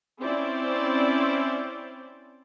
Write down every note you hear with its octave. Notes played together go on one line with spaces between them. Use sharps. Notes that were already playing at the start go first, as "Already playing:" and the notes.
C4 C#4 E4 C5 D5